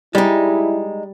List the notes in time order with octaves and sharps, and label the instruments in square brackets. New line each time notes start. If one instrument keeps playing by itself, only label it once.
[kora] G3 [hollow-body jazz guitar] G#3 D#4 [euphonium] E4